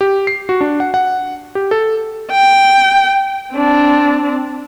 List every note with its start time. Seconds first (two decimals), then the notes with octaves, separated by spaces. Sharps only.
0.01 G4
0.27 C7
0.49 F#4
0.61 D4
0.80 F#5
0.94 F#5
1.55 G4
1.71 A4
2.31 G5
3.53 C4 D4